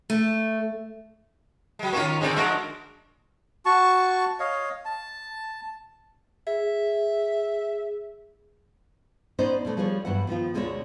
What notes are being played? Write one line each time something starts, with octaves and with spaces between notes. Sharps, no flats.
A3
F#3 G#3
D#3 A#3 C#4 F4 C#5
D3 G#3 C4 D4 D#4 D5
F3 G#3 D4 F#4 A#4
F#4 A5 C#6
C#5 D#5 F5
A5
G#4 E5
B3 C#4 D#4 C5 D5 D#5
B2 G3 A3 D4
F3 G3 D4 G#4 C5 C#5
G2 E3 F#3 B3 F#5
D#3 F3 B3 F4
D2 B2 G#3 D4 G#4 C#5